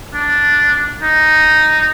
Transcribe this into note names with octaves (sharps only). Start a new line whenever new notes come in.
D4
D#4